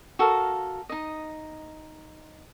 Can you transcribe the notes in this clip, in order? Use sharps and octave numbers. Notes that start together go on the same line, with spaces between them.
F#4 A4 A#4 F5
D#4 D#5